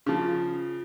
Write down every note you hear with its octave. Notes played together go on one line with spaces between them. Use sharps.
C#3 F3